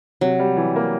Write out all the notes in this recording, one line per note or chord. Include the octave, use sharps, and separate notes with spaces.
C3 F#3
G3
E3
A#3